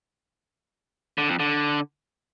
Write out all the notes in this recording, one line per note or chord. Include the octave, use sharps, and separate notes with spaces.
D3
F2
D3